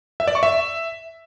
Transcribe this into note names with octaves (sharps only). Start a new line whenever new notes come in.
E5
D5
C#6
E5